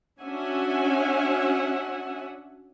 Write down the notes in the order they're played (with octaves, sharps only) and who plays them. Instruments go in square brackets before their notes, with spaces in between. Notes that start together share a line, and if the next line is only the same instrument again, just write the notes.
[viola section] C#4 D4 F#4 E5 F#5 G#5